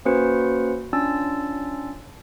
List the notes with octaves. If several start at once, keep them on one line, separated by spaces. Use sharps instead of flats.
A#3 C#4 F#4 B4 C5 C#7
C#4 D4 F4 E6 A6